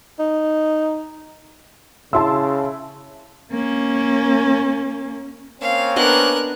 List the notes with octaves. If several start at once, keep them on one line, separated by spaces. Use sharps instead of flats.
D#4
C#3 E4 A5 C6 E6
A#3 C#4
A#3 C4 C#4 F5
B3 D4 A#4 D#5 F#6